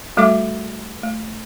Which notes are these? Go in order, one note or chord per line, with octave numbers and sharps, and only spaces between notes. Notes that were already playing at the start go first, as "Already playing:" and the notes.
G3 A3 F#4 A4 E5 D6
A3